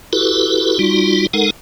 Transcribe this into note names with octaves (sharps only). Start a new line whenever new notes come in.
E4 F#4 G4 A4 B4
G3 D#4 F4 F#4
G#3 D#4 A4 A#4 F#5